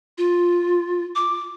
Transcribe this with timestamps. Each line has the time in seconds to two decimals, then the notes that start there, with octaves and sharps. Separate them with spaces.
0.18 F4
1.15 D6